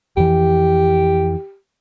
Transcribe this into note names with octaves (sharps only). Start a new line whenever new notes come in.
F2 E3 G4